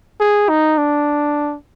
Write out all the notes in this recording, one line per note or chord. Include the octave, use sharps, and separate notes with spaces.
G#4
D#4
D4